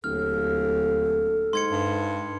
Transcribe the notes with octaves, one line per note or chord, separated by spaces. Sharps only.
D1 D#2 A4 F6
G#2 C6 G#6 C#7
G2